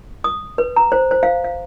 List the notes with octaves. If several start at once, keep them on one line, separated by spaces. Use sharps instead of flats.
D#6
B4
A#5
C5
C5
F5
F5